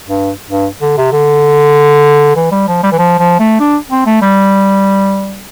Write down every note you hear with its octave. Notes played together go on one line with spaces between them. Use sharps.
G2
G2
D3
C3
D3
E3
G3
F3
G3
E3
F3
F3
A3
D4
C4
A3
G3